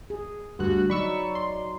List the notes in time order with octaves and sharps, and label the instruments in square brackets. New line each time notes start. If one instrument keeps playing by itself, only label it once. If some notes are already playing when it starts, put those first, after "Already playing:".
[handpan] G#4
[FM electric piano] D2 G2 F#6 [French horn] F#4
[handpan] F#3 D#4 [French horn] D5 [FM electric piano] B5 C#6 E6
[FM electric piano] C6